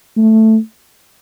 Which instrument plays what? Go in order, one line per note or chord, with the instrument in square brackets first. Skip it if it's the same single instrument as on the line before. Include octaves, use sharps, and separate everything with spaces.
[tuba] A3